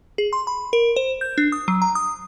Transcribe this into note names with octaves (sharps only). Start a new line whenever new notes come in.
G#4
C6
B5
A#4
C5
G6
D4
D#6
F#3
A#5
D#6